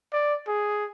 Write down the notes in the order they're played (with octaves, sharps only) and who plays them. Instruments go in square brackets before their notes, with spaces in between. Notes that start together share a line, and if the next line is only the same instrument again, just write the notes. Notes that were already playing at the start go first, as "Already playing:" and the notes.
[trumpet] D5
G#4